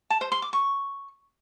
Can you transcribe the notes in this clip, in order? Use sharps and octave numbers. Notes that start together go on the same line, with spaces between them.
A5
C5
C6
D6
C#6